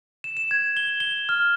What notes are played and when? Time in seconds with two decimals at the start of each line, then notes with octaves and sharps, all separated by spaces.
0.24 E7
0.37 E7
0.51 G#6
0.77 G7
1.00 G7
1.29 F6